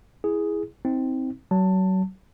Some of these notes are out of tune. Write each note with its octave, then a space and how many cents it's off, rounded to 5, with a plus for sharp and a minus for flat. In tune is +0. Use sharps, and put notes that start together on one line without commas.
E4 +0 G#4 +0
C4 +0 D#4 +40
F#3 +30 A5 +20